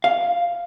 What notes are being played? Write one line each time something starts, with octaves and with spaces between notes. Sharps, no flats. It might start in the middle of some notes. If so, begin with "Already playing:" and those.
F5